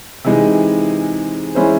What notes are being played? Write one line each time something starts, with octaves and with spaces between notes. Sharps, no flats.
C3 E3 G#3 D#4
E3 G#3 C#4 E4 C5